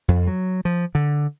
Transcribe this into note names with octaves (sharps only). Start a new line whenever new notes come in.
F2
F#3
F3
D3